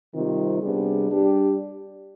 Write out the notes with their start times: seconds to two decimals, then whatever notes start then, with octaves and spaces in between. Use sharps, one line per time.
0.15 C3 D#3 G3 C4 F4
0.62 C3 G3 B3 D4 G#4
1.11 G3 D4 G4